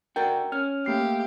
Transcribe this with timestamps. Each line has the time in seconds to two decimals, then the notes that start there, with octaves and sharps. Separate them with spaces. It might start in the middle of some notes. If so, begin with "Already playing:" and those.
0.16 D4 F#4 A#4 G5
0.52 C#4 F6
0.86 A3 A#3 G4 C7